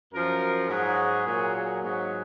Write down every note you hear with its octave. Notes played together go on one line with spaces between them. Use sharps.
F#2 F3 A#4
G#2 F#3 G#4
A#2 F#3
G#4
G#2 F#3 G#4